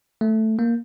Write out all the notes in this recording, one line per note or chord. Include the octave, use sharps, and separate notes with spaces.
A3
A#3